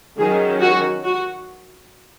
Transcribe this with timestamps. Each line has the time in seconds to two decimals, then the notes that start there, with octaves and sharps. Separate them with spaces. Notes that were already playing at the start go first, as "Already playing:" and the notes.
0.18 D#3 F#3 C#4 G#4
0.61 F#4
1.05 F#4